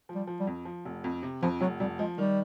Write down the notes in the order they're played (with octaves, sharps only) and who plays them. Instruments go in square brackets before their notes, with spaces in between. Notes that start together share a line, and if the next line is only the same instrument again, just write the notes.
[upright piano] F3
[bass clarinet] G3
[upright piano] F3
[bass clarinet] G3
[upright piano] F2
F3
F1
F2
C3
[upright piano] F2 [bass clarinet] F3
[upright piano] F1 [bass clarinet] F#3
[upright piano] F1 [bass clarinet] G3
[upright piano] F3 [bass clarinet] G#3
[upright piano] D#3 [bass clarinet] G3